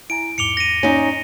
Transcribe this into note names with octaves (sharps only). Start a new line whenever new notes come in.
E4 G#5 A#5 D7
E2 G#2 D6 C#7 F7 G7
A#6 D#7
C#4 D#4